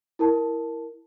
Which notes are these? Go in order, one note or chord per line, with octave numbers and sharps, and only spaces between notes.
E4 A#4 A5